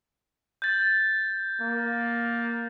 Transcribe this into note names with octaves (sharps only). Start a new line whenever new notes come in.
G6 A6
A#3